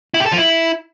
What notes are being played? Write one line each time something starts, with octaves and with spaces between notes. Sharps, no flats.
E4
G4
A4
F3
E4